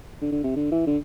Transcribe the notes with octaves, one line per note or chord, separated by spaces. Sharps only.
D3
D3
C3
D3
E3
D3